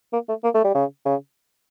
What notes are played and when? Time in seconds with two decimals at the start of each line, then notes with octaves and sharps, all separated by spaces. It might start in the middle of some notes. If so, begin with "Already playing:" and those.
0.13 A#3
0.29 A3
0.44 A#3
0.54 A3
0.64 G3
0.74 C#3
1.05 C#3